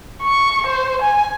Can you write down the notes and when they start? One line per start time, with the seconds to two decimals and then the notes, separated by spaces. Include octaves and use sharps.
0.21 C#6
0.66 C5
1.02 G#5